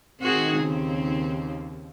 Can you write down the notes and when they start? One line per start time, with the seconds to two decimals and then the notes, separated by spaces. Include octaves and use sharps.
0.20 D#3 C4 F#4 G#4
0.58 D#2 C#3 C4